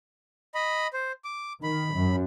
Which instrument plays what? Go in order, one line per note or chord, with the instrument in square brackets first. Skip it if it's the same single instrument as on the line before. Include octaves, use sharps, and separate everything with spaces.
[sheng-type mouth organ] D#5 B5
C5
D6
[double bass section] D#3 [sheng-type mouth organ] B5
[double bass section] F#2